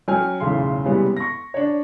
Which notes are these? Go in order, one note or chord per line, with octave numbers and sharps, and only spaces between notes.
F#3 C#4 G5 G#5 F6
B1 E2 A2 C#3 C6
C3 E3 G3 G#3 B3 C#4
C#6 A#6
D4 C#5